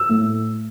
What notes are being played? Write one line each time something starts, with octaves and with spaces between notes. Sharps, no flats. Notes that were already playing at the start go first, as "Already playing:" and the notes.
Already playing: E6
A2